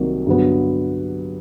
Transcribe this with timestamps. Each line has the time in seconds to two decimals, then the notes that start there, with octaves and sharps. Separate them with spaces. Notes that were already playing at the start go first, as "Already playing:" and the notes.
Already playing: C2 C3 D#3 F#3 A#3
0.27 G2 D3 F#3 B3